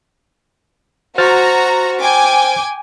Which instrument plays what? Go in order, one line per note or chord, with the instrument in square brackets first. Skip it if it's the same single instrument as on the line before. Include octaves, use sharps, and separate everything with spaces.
[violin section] F#4 A#5 [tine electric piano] C5 F6 A6
[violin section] G5 G#5 D6